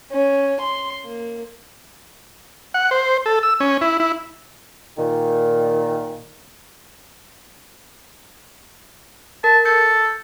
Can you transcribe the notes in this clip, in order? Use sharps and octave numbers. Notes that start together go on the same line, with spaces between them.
C#4
C6
A#3
F#5
C5
A4
E6
C#4
E4
E4
A#2 D#3
A#4 A5
A4 G6 A6 C#7